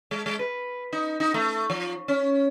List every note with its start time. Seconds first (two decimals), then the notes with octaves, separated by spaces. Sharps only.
0.11 G#3
0.26 G#3
0.39 B4
0.93 D#4
1.20 D#4
1.34 A3
1.70 F3
2.08 C#4